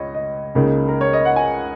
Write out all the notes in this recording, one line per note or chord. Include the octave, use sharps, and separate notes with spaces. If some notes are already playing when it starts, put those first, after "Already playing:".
Already playing: C#2 C#5 D#5
D#5
C#2 C#3 A#3 D#4
A#4
C#5
D#5
F#5
G#5